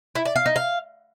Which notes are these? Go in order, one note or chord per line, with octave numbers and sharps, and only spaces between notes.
E4
D5
F5
D#4
F5